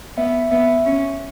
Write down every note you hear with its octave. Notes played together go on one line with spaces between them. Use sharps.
B3 E5
B3 E5
C#4